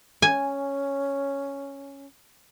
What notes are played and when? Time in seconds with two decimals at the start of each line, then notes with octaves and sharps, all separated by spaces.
0.22 C#4 G#5